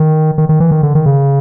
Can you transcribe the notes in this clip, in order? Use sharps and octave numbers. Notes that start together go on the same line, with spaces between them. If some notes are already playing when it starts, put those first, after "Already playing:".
Already playing: D#3
D#3
D#3
E3
D#3
D3
D#3
C#3